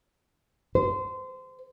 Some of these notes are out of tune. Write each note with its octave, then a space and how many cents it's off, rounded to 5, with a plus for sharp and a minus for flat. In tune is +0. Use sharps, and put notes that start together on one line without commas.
C5 -25